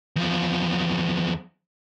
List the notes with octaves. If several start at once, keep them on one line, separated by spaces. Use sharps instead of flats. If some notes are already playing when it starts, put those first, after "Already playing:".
E2 F3